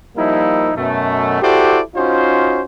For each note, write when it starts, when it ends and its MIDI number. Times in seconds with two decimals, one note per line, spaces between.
0.17 0.71 53
0.17 0.71 55
0.17 0.71 58
0.17 0.71 63
0.17 0.71 64
0.76 1.39 42
0.76 1.39 47
0.76 1.39 57
1.42 1.80 64
1.42 1.80 66
1.42 1.80 67
1.42 1.80 69
1.42 1.80 72
1.42 1.80 74
1.96 2.62 61
1.96 2.62 63
1.96 2.62 65
1.96 2.62 66
1.96 2.62 72